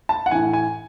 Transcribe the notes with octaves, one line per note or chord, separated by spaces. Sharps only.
A5
F#5
A2 E3 G#5
G#5